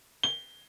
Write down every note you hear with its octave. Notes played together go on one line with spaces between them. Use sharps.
G7